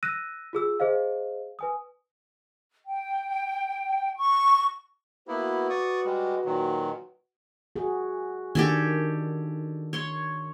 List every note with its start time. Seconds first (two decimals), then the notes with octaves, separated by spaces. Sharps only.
0.03 E6 F#6 A#6 D#7
0.53 F4 G#4 E6
0.80 G#4 C5 D#5 F5
1.59 B4 G#5 D#6
2.86 G5
4.17 C#6
5.28 A#3 B3 E4 F#4 B4
5.70 D5 C#6 D#6
6.05 G3 G#3
6.45 A#2 D#3 F#3
7.76 F#4 G#4
8.55 D#3 D4 G4 A4 G#5
9.93 C#5 C6